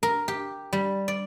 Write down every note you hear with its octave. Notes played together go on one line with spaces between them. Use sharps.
A#4
G4
G3
D5